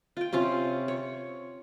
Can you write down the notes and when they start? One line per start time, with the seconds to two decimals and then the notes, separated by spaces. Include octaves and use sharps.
0.17 F4 G5
0.33 C3 C#4 F4 F5
0.88 C#5